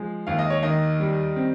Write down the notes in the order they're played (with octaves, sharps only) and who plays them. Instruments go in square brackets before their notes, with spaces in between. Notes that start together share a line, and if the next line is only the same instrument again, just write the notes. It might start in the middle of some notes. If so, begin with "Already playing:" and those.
Already playing: [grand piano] F3 G#3
D#2 F5
D#5
C#5
D#3 D#5
G3
C4